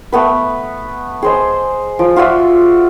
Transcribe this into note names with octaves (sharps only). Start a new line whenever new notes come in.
A3 B3 B4
G#4 C5 D#5
F3
F4 F#4 D5 E5